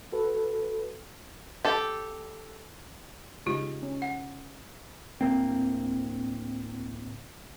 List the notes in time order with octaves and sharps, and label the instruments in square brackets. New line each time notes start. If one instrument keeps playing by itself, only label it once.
[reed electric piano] F#4 A4 B4
[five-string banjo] G4 A4
[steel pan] C#3 G#3 D#4 [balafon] F4 G4
[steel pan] C#4
[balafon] F#5
[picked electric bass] D1 G1 A#3 C4